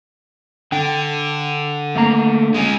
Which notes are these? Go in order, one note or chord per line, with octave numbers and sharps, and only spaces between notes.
D3 G5
A3 A#3 A#5
G#3 C#4